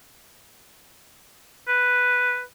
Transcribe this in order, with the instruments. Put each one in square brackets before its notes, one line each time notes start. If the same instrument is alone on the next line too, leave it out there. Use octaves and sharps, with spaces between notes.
[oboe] B4